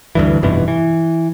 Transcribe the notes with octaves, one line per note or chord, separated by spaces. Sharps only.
D2 G2 E3
F1 G2 B2 E3
E3